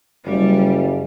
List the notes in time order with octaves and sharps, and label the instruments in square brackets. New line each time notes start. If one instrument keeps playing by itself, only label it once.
[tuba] F#1 [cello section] G3